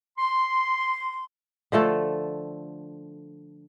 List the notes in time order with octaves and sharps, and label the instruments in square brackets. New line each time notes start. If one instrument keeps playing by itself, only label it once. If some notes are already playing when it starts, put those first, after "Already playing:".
[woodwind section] C6
[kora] D3 F3 A3 A4